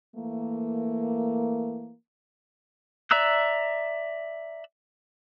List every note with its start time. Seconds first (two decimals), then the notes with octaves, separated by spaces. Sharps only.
0.15 E3 A3 A#3
3.11 D5 E5 A#5 E6 F#6